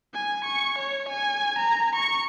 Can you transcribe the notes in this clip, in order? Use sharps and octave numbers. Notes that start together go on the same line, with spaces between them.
G#5
C#6
C#5
G#5
A#5
C#6